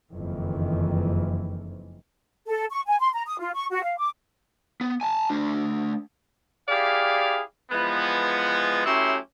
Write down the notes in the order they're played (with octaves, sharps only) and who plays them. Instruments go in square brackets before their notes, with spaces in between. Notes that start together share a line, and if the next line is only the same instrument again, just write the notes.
[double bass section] F#1 F2 D#3 E3
[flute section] A4
C#6
G#5
C6
A#5
D#6
F4
C#6
F#4
F5
D6
[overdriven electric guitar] B3
G#5 A5
A3 D4
[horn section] E4 G4 G#4 D5 F5
E3 F3 G#3 B3
F#3 A3 C#4 E4 G4 C6